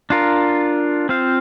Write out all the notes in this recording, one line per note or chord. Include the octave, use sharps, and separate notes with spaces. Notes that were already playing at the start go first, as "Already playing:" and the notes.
D4 F4 A#4
C4 F4 C5 F5